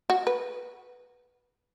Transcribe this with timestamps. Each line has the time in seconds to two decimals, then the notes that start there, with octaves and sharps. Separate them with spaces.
0.10 F#4
0.27 B4